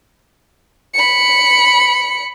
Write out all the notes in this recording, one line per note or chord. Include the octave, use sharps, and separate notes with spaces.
B5 C#7